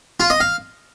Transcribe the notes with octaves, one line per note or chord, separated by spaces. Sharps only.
F4
D#5
F5